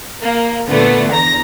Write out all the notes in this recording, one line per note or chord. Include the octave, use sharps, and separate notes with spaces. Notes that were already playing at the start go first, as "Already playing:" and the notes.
A#3
A#2 D3 A3 B3
E2 A#5 A#6